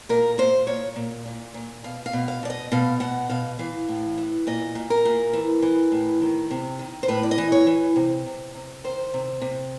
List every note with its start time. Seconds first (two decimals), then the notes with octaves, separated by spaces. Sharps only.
0.09 A#2 A#4
0.38 A#2 C5
0.67 A#2 C#5
0.96 A#2
1.26 A#2
1.54 A#2
1.84 B2 F5
2.06 F5
2.13 B2
2.28 F5
2.43 B2 D5
2.50 D#5
2.72 B2 F5
3.00 B2 F#5
3.29 B2 F5
3.59 E3 F5
3.88 A2
4.18 E3
4.47 A#2 D#5
4.75 A#2
4.90 A#4
5.05 A#2
5.33 E3
5.62 E3
5.92 A2
6.22 D#3
6.51 C3
6.79 D#3
7.03 C5
7.08 A2 B4
7.23 D5
7.31 D#5
7.38 E3
7.52 C#5
7.67 E3
7.96 C3
8.26 C3
8.54 C3
8.84 D#3 C5
9.14 C3
9.41 C3